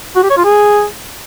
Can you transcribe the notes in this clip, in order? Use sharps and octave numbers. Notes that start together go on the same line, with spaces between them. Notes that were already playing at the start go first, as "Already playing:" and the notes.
F#4
G4
C#5
F4
G#4